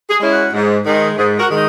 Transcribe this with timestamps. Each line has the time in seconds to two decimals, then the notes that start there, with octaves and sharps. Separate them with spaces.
0.10 G#4
0.21 G#3 C#4 E4
0.31 F#4
0.53 G#2
0.86 D#3 G#3 D#4
1.18 G#2 G#4
1.39 F#4 A#4
1.51 D#3 G#3 D#4